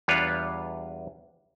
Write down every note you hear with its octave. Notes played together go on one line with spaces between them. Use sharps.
E2 G3 D4 F4 B4 C#5